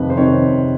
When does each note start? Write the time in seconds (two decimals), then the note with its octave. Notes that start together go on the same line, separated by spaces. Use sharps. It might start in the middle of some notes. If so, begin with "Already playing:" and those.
Already playing: F2 C3 D#3 B4
0.10 C5
0.17 F2 C3 D#3 C#5